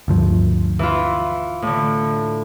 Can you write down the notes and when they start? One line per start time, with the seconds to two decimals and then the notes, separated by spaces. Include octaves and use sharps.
0.08 D2 G2 F3
0.79 E3 E4 F4
1.62 A2 D3